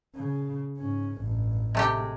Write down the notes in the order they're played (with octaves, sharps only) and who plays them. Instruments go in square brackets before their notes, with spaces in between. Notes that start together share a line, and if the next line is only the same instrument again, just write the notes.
[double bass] C#3
G#2 C#4
A1 G2
[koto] C3 A3 G4 [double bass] G#3